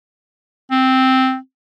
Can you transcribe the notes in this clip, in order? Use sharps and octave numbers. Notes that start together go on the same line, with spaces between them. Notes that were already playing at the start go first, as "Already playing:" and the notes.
C4